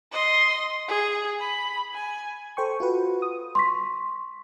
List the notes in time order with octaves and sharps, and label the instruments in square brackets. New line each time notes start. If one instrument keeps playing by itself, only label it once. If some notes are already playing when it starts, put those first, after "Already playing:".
[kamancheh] D#5 C6
G#4
B5
G#5
[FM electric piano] A4 C5 G5 C#6
F4 F#4 B4
D#6
[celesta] C6 C#6 B6